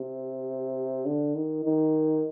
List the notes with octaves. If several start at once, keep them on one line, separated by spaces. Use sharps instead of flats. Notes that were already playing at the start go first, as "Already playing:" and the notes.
Already playing: C3
D3
D#3
D#3